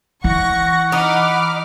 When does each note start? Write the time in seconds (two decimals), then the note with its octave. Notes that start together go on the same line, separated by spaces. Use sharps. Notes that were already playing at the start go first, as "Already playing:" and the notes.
0.24 E3 F#5 C#6 A#6
0.92 D#4 B5 D6 F6